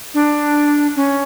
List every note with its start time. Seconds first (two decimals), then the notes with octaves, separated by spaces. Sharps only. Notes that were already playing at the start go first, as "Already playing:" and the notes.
0.14 D4
0.96 C#4